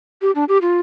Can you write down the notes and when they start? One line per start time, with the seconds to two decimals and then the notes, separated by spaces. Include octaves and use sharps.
0.22 G4
0.35 D4
0.49 G4
0.62 F4